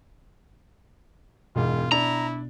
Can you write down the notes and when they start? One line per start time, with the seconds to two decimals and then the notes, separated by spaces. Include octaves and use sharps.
1.56 E1 G#2 B2 F4
1.92 D4 E4 A#5